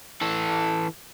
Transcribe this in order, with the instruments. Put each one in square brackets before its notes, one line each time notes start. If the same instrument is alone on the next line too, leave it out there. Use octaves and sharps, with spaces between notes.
[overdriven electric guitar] E3 A4